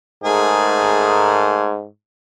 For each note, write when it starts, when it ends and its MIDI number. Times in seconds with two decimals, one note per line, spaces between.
0.24 1.86 44
0.24 1.72 57
0.24 1.72 68
0.24 1.72 70